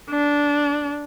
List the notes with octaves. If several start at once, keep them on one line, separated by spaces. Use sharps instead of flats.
D4